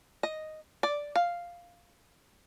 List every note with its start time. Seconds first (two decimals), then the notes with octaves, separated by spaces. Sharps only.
0.23 D#5
0.83 D5
1.16 F5